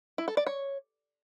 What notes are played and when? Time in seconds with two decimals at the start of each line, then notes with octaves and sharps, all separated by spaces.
0.18 E4
0.28 A4
0.37 D5
0.47 C#5